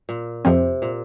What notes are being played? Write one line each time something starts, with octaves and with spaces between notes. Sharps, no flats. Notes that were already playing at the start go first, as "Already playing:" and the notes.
A#2
F2 C3 F3 C4
A#2